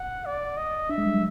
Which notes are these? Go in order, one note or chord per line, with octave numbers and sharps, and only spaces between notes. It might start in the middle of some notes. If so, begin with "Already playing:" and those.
Already playing: F#5
D5
D#5
D4 E5
G#3
G3
F#3